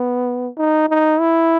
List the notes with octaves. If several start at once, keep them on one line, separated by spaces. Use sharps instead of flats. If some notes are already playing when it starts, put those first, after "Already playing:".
Already playing: B3
D#4
D#4
E4